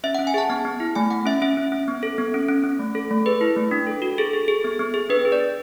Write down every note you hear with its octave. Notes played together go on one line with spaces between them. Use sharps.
C#4 E5
C#4 F#5
G#5
G#4 A5
B3 A5
B3
E4
A3 G#5
A3 F#5
C#4 E5
C#4 E5
C#4
C#4
B3
A4
B3
C#4
C#4
C#4
A3
A4
A3
G#4 B4
E4
A3
D4
A4
F#4
G#4 A4
G#4
G#4
B3
B3
G#4
D4 B4
G#4
D5
G#4